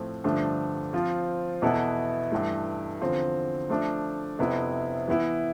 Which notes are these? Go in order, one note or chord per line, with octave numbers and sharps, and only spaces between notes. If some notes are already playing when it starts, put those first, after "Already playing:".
Already playing: A2 F3 A3 C4
G2 D3 F3 A3 D4
F3 C4 F4
E2 B2 B3 E4 A4
G2 E3 A3
E2 D3 F3 C4 F4
F3 A3 D4
F2 C3 F3 B3 E4
E3 B3 E4